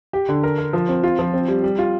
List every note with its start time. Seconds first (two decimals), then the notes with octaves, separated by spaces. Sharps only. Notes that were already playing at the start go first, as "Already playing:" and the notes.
0.13 G4
0.29 D3
0.44 A#4
0.58 A#4
0.73 F3
0.89 C4
1.03 F4
1.19 F3
1.34 C4
1.48 G3
1.64 G3
1.79 F4